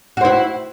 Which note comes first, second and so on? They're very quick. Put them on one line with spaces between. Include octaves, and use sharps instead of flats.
F#4 C5 E4